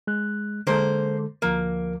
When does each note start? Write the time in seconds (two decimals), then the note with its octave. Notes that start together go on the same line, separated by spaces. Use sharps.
0.07 G#3 F#6
0.67 D3 G#3 A#3 A4 C5
1.42 D2 F3 A#3 A#4